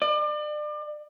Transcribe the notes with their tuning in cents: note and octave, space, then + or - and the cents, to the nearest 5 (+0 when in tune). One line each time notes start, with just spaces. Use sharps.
D5 +35